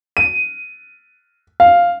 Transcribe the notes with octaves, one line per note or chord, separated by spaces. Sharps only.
D#7
F5